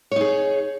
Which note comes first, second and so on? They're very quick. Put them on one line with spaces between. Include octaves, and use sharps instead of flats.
C#5 D#4 G#4